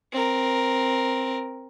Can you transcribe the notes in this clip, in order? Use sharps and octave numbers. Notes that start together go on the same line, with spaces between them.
C4 A#4